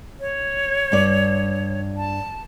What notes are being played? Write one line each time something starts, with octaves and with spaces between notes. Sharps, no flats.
C#5
G2 D5
A5